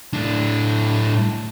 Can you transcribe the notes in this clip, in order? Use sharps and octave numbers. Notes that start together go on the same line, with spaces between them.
A2 D4